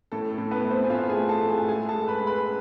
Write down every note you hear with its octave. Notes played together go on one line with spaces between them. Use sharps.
A2 A4
A4
A2
B3 B4
A3
C4 C5
G#5
A2 F4 F5
G#4 G#5
A3
A4 A5
A2
G#4 G#5
G#3 G#4 G#5
A4 A5
G#3
B4 B5
G#3
B4 B5